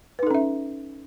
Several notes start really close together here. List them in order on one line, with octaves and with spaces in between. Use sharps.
B4 D#4 A4 C#4 E5